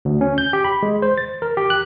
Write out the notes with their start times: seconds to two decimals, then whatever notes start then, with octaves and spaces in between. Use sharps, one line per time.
0.05 D2
0.21 C#4
0.38 G6
0.53 G4
0.64 B5
0.83 G#3
1.02 C5
1.18 A6
1.42 A#4
1.57 G4
1.70 F#6